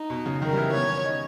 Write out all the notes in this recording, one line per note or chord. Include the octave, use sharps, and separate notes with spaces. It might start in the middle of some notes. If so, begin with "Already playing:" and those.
Already playing: D#4
B2
C#3
D#3 A#4
G3
E3
B3 C#5
C#4
D#4